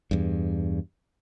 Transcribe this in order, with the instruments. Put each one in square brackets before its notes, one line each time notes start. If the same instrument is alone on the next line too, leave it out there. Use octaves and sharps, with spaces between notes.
[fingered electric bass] E2 G2